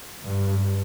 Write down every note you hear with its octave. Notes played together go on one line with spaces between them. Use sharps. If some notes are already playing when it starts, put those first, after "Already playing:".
G2